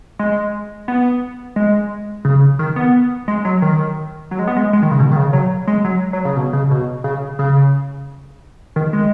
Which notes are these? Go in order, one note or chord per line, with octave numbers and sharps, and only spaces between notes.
G#3
B3
G#3
C#3
D#3
B3
G#3
F#3
D#3
F#3
G#3
B3
G#3
G#3
D#3
C#3
B2
D#3
C#3
F#3
G#3
F#3
F#3
C#3
B2
C#3
B2
C#3
C#3
D#3
G#3